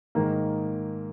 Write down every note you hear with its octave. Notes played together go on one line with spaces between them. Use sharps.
G#2 D#3 A#3